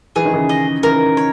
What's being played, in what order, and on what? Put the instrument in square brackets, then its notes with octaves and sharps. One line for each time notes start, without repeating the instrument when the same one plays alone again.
[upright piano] E3 [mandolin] G#4
[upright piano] D#3
C#3 E3
[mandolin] D#5
[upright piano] C#3 E3 [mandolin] A#4
[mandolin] C#5